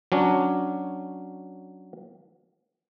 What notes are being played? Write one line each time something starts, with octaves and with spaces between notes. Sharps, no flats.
F#3 C#4 D4